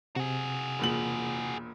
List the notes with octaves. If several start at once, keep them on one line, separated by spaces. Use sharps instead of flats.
C3 F#4 G#4
E1 A#2 F#7